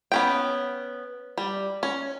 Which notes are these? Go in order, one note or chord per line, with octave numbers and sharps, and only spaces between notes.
B3 C#4 G5
G3
C#4